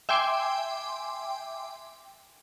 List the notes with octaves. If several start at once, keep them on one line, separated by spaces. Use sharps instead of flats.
E5 G5 G#5 C6 D6